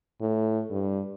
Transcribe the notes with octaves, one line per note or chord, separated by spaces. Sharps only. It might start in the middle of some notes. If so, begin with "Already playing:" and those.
A2
G2